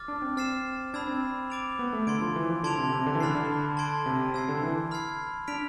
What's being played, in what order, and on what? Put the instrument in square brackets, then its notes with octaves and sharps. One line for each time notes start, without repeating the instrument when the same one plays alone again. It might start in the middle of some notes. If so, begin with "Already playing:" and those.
Already playing: [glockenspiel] D6 F6 A6
[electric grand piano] D4
C4
[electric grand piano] C4 [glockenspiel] F6 A6 C7 E7
[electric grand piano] D4 [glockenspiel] B5 E6 G#6
[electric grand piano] C4
[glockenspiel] D6 A6 D7 F7
[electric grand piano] B3
A3
[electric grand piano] D3 [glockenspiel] C6 G#6 D7
[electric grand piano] F3
E3
F3
[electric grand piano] D3 [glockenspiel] A5 C6 G#6 D7 F7
[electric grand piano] C3
C3
D3
E3
[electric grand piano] D3 [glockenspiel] B5 F6 A6 C7
[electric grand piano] D3
[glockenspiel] A5 C6 G#6 D7
[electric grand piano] C3
[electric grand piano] C3 [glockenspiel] E6 G#6 C7
[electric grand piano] D3
E3
[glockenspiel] B5 F6 G#6 C7
[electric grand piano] D4 [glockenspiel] F6 B6 D7 F7